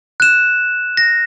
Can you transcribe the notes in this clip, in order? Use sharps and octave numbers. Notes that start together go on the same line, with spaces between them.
F#6 E7
A#6